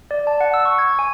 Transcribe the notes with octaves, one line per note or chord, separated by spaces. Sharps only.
D5
A5
F#5
E6
C#6
G#6
G#5